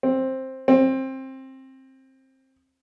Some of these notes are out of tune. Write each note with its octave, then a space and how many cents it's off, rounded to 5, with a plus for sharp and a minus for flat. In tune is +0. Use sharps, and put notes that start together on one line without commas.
C4 +10
C4 +20